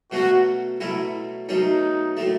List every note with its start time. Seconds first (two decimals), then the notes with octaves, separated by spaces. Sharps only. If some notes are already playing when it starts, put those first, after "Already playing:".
0.11 B2 F#3 A3 C#4 F#4
0.80 B2 F#3 A3 C#4 E4
1.49 B2 F#3 A3 C#4 D#4
2.17 A2 F#3 A3